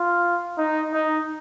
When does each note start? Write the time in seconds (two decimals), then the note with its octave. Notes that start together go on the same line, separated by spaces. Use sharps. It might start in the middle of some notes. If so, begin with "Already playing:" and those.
Already playing: F4
0.58 D#4
0.94 D#4